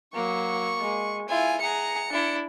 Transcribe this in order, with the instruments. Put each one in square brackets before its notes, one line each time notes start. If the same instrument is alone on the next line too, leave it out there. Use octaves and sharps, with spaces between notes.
[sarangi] F#3 [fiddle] A#3 [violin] C#6
[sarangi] G#3
[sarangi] E4 [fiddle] F4 [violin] G#5
[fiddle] G#4 F#5 [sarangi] A#5 [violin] C#7
[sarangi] D4 [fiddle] E4